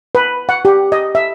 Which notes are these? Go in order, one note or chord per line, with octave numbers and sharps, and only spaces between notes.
B4
F#5
G4
D#5
E5